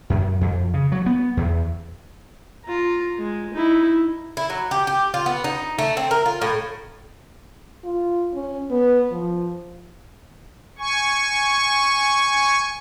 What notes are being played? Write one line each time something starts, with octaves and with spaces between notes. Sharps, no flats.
F#2
F2
C#3
F#3
B3
E2
F4 A#5
G#3
D#4 E4
E4
F#3
G4
G4
F4
B3
D#4
A3
C4
A#4
F4
A2
F4
C#4
B3
F3
G#5 C#6